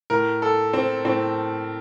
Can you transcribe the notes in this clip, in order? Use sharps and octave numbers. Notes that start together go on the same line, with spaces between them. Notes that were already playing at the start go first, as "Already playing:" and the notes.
A2 A#4
A4
C4
A2 C4